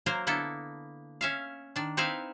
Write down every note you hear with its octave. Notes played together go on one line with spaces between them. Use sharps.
F#3 A#3 A#4 C5
D3 A#3 B3 E4 A4
C#4 E5 F5
D#3 D4
C4 D#4 E4 B4 E5 F5